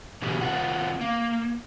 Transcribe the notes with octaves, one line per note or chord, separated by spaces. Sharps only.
B2 D3 E3 G4 G#4
D#3 C4 F4 F#5
A#3